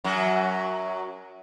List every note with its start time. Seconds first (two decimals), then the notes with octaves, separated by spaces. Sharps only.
0.04 F#2 F#3